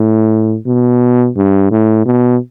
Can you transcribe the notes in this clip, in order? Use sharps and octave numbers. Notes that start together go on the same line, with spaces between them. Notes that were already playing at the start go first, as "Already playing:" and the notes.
Already playing: A2
B2
G2
A2
B2